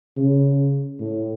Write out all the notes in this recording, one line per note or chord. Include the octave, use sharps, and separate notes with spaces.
C#3
A2